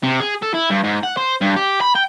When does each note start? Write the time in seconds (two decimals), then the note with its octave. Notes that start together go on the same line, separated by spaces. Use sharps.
0.03 C3
0.20 G#4
0.42 A4
0.54 E4
0.70 G2
0.84 G#2
1.03 F#5
1.17 C5
1.41 G2
1.57 G4
1.81 B5
1.95 G5